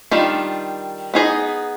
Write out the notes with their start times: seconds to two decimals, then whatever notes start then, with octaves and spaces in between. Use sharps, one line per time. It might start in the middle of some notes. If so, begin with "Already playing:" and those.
0.11 D#3 G3 D4 F4
1.14 B3 D#4 G#4 C5 D#5